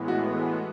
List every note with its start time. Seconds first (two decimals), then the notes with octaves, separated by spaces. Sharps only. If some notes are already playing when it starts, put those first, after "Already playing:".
Already playing: A2 E3 G#3 B3
0.08 F#4